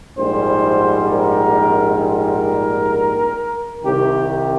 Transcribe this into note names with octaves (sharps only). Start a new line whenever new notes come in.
A#1 G#2 G3 C5
A#4
A#4
C2 C3 D#3 G4